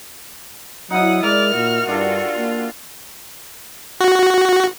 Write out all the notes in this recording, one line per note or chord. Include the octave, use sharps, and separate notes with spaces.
F#3 D#4 E4 F#5 D#6
G#3 A#4 D5 F6
A#2 F#4
G2 D4 F4 G4 A4
A#3
F#4